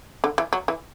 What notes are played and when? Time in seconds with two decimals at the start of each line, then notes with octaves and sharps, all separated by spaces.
0.24 D3
0.38 E3
0.53 F#3
0.68 E3